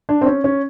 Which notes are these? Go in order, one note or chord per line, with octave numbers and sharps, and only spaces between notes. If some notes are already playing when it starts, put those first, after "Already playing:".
D4
C4
C#4
C#4